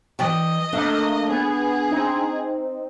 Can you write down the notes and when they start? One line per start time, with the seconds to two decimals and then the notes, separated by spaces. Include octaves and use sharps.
0.19 E3 D5 D#5 G5
0.73 A3 A#3 D4
1.29 B3 G#4
1.91 C4 D#4